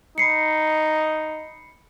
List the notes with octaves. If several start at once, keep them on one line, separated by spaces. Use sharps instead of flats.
D#4 B5 C7 C#7